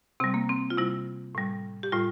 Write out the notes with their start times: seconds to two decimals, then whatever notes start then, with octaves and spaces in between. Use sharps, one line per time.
0.20 C3 C4
0.24 G3
0.34 A#3
0.49 C4
0.70 F4
0.77 C3 G3 E4
1.35 A2 G3
1.83 G4
1.92 A2 G3 F4